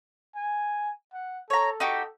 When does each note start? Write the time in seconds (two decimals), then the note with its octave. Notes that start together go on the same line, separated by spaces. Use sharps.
0.36 G#5
1.13 F#5
1.50 A4 C#5 A#5
1.80 D#4 F#4 G4